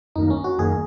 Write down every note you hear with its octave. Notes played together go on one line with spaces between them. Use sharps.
F#2 D#3 A#3 D#4
C#4
F#4
F#2 D#3 A#3 G#4